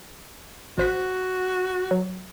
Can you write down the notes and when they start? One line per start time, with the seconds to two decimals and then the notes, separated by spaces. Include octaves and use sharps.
0.78 A1 F#4 C5 B6
1.91 F#3